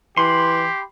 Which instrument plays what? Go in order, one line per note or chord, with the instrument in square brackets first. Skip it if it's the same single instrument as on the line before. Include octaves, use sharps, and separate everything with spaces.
[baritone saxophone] E3 [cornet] G4 [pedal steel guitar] B5 C6